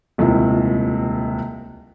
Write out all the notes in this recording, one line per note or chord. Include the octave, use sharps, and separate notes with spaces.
D#1 C#2 C3 D#3 E4